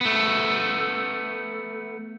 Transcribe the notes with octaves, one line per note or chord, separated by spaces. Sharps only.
A3 B3